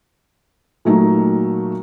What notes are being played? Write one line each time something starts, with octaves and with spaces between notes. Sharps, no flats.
A#2 F#3 A3 D#4